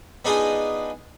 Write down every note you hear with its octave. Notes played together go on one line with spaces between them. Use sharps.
B3 D4 D#4 F4 G#4